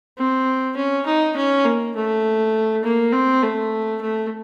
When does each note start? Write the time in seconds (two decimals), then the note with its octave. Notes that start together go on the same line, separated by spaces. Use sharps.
0.17 C4
0.76 C#4
1.06 D#4
1.36 C#4
1.65 A#3
1.95 A3
2.83 A#3
3.12 C4
3.42 A3
4.01 A3